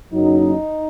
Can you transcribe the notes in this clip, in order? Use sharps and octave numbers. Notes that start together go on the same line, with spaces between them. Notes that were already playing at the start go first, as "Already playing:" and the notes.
F#1 F#2 F#3 D#4